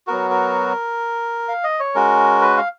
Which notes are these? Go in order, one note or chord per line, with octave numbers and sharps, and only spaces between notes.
F#3 B3 F#4 A#4
A#4
F5
D#5
C#5
G#3 C#4 F#4 A#4
B4
F5